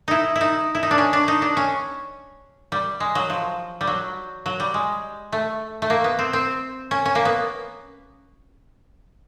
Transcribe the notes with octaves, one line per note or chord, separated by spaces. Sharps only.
D#4 E4
E4
D#4
E4
D#4
D4
C#4
D4
D#4
D4
C#4
G3
G#3
F#3
F3
G3
F#3
F#3
G3
G#3
A3
A3
A#3
B3
C4
C4
C#4
C#4
A#3
B3